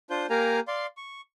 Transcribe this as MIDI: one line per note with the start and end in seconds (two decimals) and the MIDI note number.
0.10 0.27 62
0.10 0.27 65
0.10 0.27 72
0.10 0.27 91
0.30 0.60 58
0.30 0.60 67
0.30 0.60 70
0.30 0.60 77
0.30 0.60 80
0.30 0.60 82
0.68 0.86 74
0.68 0.86 77
0.68 0.86 84
0.97 1.21 85